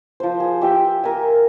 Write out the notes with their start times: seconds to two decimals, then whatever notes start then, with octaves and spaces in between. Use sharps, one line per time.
0.20 F3 C5
0.40 G#4
0.61 G4 E5 G5
1.04 A#4 G#5